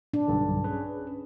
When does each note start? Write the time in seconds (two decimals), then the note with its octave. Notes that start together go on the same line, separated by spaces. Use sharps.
0.14 D4
0.28 B1 G2 D3
0.64 C#4 G#4 B4